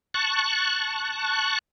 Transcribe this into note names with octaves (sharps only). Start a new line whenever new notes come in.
A5 C#6 F#6